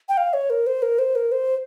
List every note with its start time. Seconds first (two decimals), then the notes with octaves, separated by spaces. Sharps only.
0.09 G5
0.17 F5
0.34 C#5
0.50 A#4
0.67 C5
0.82 A#4
0.99 C5
1.15 A#4
1.32 C5